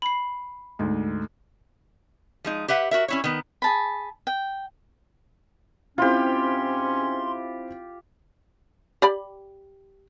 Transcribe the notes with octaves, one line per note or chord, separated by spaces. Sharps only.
B5 C7
D2 G#2
F3 G#3 D#4
G4 B4 E5 F#5
F#4 A#4 E5
C#4 E4 C#5
D#3 B3
G#4 A5 B5
G5
G#2 C4 C#4 E4 F4 G4 C6
G4 D5 B5